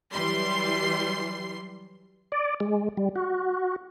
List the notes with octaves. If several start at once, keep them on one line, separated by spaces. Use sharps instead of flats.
E3 F#3 G3 C6 C7
D5
G#3
G3
F#4